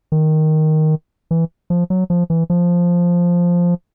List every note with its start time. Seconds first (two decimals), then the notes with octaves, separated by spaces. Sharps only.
0.12 D#3
1.31 E3
1.70 F3
1.90 F#3
2.10 F3
2.30 E3
2.50 F3